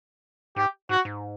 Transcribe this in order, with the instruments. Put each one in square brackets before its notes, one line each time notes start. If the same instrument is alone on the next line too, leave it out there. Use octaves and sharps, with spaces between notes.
[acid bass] G#2 [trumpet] G4
[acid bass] G#2 [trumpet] F#4
[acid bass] G#2